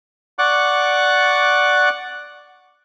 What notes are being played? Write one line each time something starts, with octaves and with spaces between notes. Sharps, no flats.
D5 F#5 C#6 D6 F#6